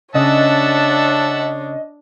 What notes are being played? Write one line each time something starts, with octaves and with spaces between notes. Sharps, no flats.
C#3 D4 C#5 D#5 E5 F#5 A5